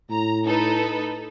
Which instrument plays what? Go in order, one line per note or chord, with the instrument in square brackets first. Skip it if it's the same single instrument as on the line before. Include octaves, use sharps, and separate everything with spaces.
[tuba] A2 [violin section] A#5
[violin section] D#4 A4 B4